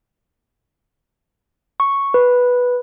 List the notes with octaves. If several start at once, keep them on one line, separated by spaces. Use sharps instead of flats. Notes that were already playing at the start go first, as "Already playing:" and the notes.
C#6
B4